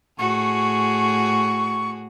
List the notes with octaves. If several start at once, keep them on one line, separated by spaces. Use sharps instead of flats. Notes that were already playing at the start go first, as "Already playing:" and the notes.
A2 F#4 G#4 C#6